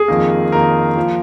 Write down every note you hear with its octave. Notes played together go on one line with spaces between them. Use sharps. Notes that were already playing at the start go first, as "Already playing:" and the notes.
Already playing: G#4
F2 D#3 A#3
F2 D#3 A#3 A#4
F3 A#3